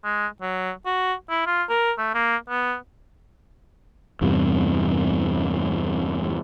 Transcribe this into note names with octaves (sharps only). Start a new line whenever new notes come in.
G#3
F#3
F#4
E4
F4
A#4
A3
A#3
B3
E2 G2 C3